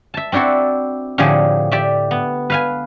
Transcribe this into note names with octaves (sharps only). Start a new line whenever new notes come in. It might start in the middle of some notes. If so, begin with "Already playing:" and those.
E5 A5
C4 D4 E4 F#4 A4
A2 D3 F3 G4 G#4
G4 D5 E5
B3
B4 F5 G#5